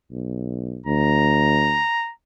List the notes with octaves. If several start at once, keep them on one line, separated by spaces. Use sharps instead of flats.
B1
D2 A#5